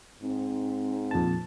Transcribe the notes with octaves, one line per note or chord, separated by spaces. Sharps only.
G#2 C4
F2 A#2 A5